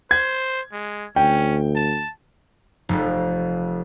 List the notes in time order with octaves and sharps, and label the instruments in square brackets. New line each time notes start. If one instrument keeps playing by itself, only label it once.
[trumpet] C5 [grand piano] G#6
[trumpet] G#3
[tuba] D2 [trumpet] C#4 [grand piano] G5
[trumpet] A5
[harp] F1 F2